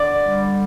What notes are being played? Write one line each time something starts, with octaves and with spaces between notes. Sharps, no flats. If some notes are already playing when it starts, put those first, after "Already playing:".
Already playing: D3 D5
G3